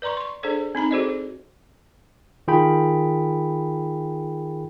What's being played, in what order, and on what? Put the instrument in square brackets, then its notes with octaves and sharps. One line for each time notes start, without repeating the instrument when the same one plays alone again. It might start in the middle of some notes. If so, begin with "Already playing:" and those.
[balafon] B4 D5 A#5 C6 C#6
C6 C#6
D4 G#4 A4 C5 D5
C4 D#4 A#5 B5
F#4 G#4 A4 C5 D5 D#5
[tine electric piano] D#3 F4 G#4 A#4 G5 B5